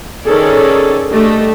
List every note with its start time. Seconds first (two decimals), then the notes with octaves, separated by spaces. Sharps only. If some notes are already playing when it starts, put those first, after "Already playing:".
0.24 D#3 C#4 G#4 A4 D5
1.11 G3 A3 D4 A4 D#5